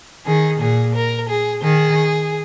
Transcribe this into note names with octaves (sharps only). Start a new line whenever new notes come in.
D#3 G#4
A#2 G#4
A#4
G#4
D#3 G#4